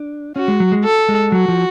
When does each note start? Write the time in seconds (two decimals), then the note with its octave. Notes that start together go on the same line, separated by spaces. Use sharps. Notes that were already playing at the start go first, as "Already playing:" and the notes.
Already playing: D4
0.36 C#4 F#4
0.48 G#3
0.60 F#3
0.72 G#3
0.84 A4
1.09 G#3
1.32 F#3 F#4
1.48 F3